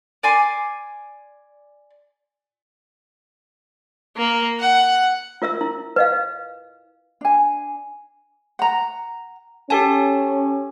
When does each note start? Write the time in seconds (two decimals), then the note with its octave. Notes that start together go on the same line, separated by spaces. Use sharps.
0.23 D5 G#5 C6
4.17 A#3
4.60 F#5
5.42 F4 A#4 E5 E6
5.61 E4
5.96 B4 D#5 F5
7.21 D4 G#5
8.59 F#5 A#5
9.70 C#4 G4 A4 G#5 A5